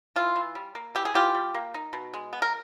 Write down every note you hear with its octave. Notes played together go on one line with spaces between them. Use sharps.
E3 F4
E3
G3
A#3
E3 G4
G#4
E3 F4 G4
G3
A#3
D#4
B2
G#3
B3
A#4